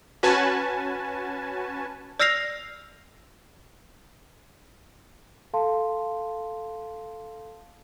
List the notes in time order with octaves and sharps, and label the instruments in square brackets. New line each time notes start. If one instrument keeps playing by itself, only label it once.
[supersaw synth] C#4 F#4 B4 G#5 A5
[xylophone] D5 E6 F6 A#6 C7 F7
[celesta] A4 F5 A5 C6